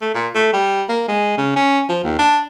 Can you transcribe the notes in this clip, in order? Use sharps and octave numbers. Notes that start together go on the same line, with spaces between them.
A3
A#2
A3
G3
A#3
G#3
C#3
C#4
F3
D#2
D4